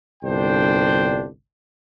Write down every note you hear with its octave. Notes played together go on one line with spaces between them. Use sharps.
G1 C2 D4 C5 G5